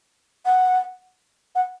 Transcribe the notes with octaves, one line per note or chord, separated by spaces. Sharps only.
F#5
F#5